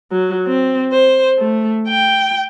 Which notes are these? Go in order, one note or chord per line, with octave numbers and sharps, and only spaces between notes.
F#3
C4
C5
A3
G5